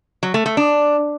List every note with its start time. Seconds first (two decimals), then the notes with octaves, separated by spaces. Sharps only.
0.23 F#3
0.34 A3
0.46 A3
0.57 D4